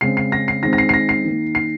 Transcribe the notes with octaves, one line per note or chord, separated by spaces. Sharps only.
C#3 G#3 C4 C7
C7
A#6
C7
D#3 G#3 C4 A#6
A#6
C7
C7
A#6
C7
D#3 A#3
C7